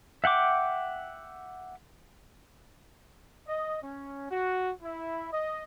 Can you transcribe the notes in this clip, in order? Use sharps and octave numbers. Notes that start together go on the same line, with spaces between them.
E5 F#5 G5 D6
D#5
C#4
F#4
E4
D#5